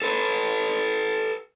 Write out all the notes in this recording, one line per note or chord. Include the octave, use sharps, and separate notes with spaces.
A4 B4